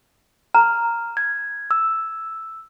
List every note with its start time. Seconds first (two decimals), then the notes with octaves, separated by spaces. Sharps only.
0.54 A#5 F6
1.17 G#6
1.71 E6